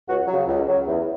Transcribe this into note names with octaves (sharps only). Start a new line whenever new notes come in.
C#2 F#4
C#3 F#3
C#2
C#3 F#3
E2